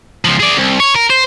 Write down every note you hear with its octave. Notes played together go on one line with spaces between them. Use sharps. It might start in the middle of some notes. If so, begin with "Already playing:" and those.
C#2 F3
G#4 D5
C2
C#5
A#4
C5